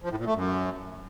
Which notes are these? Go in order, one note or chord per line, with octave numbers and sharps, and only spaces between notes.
F3
A2
A#2
A3
F#2